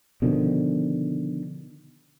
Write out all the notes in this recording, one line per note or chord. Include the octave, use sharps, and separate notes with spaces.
B2 D3 D#3 F3